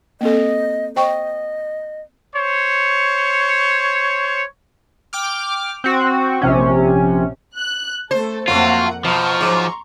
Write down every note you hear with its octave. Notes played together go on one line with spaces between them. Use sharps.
A#3 C4 A4 D#5
C5 D#5 G5 C#6
C5 C#5
G5 D6 F6
C4 F#4
A#1 C3 C#4
F#6
A3 A4 C5
F2 F#3 A3 A#3 C4 F4 F#5
B2 F3 A#5 C6 C#6
G#2 F#3